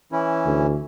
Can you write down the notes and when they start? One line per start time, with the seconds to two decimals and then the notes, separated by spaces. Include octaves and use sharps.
0.12 E3 C#4 E4
0.45 D2